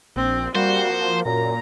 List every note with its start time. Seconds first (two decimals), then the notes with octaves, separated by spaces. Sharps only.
0.16 A#1 C4
0.55 G3 A#3 F#4 C5
0.89 F3
1.25 F#2 A#2 A#5